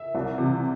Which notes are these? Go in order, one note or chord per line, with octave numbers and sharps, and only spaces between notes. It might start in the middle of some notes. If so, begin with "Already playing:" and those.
Already playing: E5
C2
C3 E3